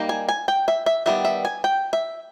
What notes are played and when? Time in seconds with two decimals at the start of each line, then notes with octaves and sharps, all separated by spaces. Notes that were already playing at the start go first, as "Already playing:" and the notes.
Already playing: G3 A#3 D#4
0.09 G#5
0.29 G#5
0.48 G5
0.68 E5
0.86 E5
1.06 D#3 G3 B3 E5
1.25 E5
1.45 G#5
1.64 G5
1.93 E5